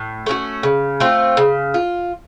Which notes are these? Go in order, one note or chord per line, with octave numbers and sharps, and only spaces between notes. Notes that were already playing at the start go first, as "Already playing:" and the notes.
Already playing: A2
A3 C#4 F#4
C#3
A3 C4 F4
C#3
F4